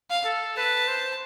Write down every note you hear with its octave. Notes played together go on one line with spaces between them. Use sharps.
F5
A4
B4 A5
C5